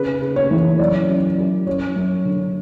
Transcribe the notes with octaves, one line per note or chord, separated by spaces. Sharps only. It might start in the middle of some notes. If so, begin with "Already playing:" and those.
Already playing: C#3 B4
C#3
C#5
E3
C#5
F#2 D5
F#2
F#2
F#2 C#5
F#2
D3